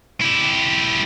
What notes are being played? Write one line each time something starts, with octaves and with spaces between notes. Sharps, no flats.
E4 G4